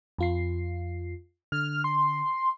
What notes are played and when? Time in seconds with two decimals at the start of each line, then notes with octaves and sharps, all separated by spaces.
0.18 F2 F4 C7
1.52 D3 F6
1.84 C6